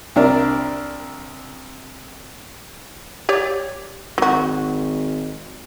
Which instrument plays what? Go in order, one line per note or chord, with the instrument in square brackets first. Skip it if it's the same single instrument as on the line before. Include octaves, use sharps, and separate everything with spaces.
[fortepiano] C2 D4 A#4 D5
[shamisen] G4 C#5 D5
[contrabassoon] G#1 [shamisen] F#3 F#4